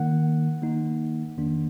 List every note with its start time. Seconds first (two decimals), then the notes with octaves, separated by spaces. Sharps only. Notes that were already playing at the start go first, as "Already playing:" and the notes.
Already playing: D#3 A#3 D#4 F#5
0.62 D#3 A#3 D#4
1.37 F2 D#3 A#3 D4